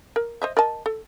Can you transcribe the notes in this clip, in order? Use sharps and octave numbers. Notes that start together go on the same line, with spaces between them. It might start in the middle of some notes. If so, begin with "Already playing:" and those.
A#4
C5 D#5 E5
A#4 D#5 A5
A4